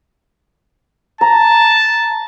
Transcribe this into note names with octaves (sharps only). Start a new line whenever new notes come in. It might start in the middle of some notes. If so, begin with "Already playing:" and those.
A5 A#5